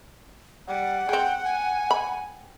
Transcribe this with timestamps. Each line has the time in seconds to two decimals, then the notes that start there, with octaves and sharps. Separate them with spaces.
0.67 G3 F#5
1.09 C4 G#4 G5
1.46 G#5
1.91 B5